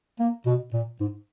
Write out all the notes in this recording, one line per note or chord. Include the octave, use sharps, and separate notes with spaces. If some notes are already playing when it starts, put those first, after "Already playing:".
A#3
B2
A#2
G#2